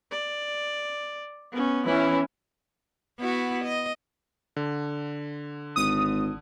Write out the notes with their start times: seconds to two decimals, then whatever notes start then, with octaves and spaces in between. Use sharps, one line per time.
0.11 D5
1.51 B3 C#4
1.85 E3 C#4 E4
3.20 B3 E4 F#4
3.64 D#5
4.56 D3
5.76 G#1 D#6